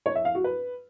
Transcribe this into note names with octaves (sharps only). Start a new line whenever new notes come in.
C#5
E5
F5
F#4
B4